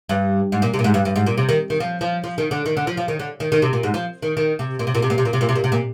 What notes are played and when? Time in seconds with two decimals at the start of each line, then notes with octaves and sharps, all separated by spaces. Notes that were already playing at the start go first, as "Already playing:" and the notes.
0.09 G2
0.52 G#2
0.62 A#2
0.74 C3
0.79 A#2
0.84 G#2
0.94 G2
1.05 G2
1.16 G#2
1.26 A#2
1.38 C3
1.49 D#3
1.70 D#3
1.80 F3
2.01 F3
2.24 F3
2.38 D#3
2.51 D3
2.66 D#3
2.77 D3
2.87 F3
2.97 F3
3.08 D#3
3.19 D3
3.40 D#3
3.52 D#3
3.62 C3
3.73 A#2
3.83 G#2
3.94 F3
4.22 D#3
4.37 D#3
4.59 C3
4.79 A#2
4.87 C3
4.95 A#2
5.02 C3
5.10 A#2
5.18 C3
5.25 A#2
5.33 C3
5.41 A#2
5.49 C3
5.55 A#2
5.64 C3
5.72 A#2